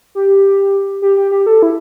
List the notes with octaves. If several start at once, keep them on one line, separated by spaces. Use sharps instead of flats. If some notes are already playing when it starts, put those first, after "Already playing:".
G4
G4
G4
G4
A4
E4